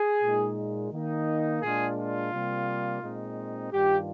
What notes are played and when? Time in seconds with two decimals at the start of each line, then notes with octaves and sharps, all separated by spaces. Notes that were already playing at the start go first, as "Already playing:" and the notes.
Already playing: G#4
0.22 A#2 G#3 D#4
0.92 D#3 A#3 D#4
1.62 A#2 G#3 D4 F4 G#4
1.98 F4
2.32 C3 G3 A#3
3.02 A#2 G#3 C4 D#4
3.72 G2 D#3 G3 D4 F4 G4